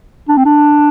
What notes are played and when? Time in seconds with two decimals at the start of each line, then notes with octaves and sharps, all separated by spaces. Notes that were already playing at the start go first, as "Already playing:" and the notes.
0.29 D4
0.37 C4
0.45 D4